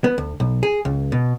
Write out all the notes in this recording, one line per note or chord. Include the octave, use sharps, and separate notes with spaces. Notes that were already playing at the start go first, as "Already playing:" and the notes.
B3
D2
B1
G#4
C#2
B2